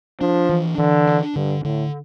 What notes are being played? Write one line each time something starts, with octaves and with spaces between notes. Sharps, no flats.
F3 D4
E3
D3 E3
D4
G2 D3
A2 D3